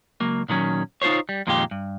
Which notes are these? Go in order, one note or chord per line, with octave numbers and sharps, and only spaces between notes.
C#2 F#3 A#3
A#2 D#3 F#3 C#4
D#4 F4 G4 C5 C#5
G3
F2 A#2 D#3 G#3 F4 G4
G2